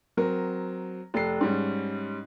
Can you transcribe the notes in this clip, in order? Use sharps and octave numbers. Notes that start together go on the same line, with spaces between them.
F#3 C4 A#4
F1 A4 C7
G#2 G3 C#4